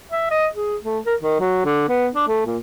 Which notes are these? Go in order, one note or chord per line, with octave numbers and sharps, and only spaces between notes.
E5
D#5
G#4
A3
A#4
D#3
F#3
D3
B3
D4
A3
A#2